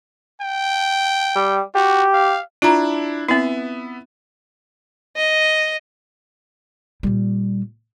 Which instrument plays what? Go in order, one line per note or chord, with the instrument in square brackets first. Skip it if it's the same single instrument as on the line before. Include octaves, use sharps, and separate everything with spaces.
[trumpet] G5
[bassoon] G3
[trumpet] F#4 [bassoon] G4
[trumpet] F5
[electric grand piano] D4 E4 [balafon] F4 A#5
[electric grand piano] B3 E5 [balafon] C4 E4
[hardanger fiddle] D#5
[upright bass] A#2 G3